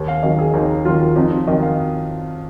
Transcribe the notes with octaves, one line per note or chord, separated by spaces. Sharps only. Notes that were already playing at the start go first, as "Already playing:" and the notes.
Already playing: D#2
F5
D#3 F#3 D#5
G#4
D#2 D#4
D#3 F#3 F4
F2 D#4
F4
D#3 F#3 D#5
F5